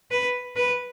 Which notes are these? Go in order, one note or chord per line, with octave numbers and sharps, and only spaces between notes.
B4
B4